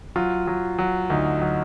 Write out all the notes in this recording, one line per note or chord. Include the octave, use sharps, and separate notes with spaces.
F#3 F4
F#3
F#3
D2 D#4
F#3